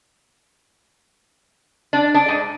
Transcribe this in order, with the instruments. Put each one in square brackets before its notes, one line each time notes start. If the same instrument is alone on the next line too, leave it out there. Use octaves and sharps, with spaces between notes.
[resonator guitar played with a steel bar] D4
D4
G#2